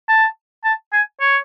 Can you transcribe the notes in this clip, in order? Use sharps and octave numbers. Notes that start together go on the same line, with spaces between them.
A5
A5
G#5
C#5